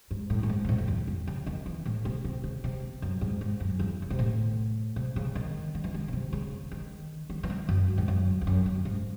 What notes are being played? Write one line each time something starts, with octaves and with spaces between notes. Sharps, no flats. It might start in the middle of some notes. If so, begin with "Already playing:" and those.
G#2
A2
F#2
G#2
C3
A2
F#2
E2
E2
C#3
D#3
E3
A2
C3
C3
C#3
C3
F#2
G#2
G#2
F#2
E2
C#3
C3
A2
C3
C#3
D#3
D#3
E3
D#3
C#3
C3
C#3
D#3
D#3
E3
D#3
F#2
G#2
F#2
E2
F#2
F#2
G#2